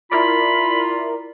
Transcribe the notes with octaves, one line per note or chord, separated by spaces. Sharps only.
E4 F4 A#4 D5 B5